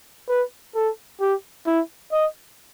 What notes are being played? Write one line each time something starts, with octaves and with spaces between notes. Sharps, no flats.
B4
A4
G4
E4
D#5